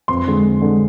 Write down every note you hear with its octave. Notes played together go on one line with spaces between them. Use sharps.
F2 C6
D3 G#3
F2
D3 G#3